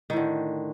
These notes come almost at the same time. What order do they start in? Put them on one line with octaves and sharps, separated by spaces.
D#3 A2 D3